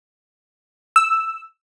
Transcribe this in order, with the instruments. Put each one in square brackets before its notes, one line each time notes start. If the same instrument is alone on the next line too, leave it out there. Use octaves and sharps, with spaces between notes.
[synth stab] E6